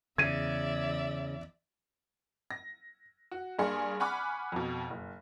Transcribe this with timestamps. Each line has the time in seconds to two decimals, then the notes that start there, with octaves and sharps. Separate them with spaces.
0.18 E2 C#3 D5 E5 G#6 D#7
2.51 A#6
3.31 F#4
3.59 G2 A#3 D4 G#4 C6 C#7
4.00 F#5 G#5 B5 C#6 D6 F6
4.52 F2 B2
4.90 F#1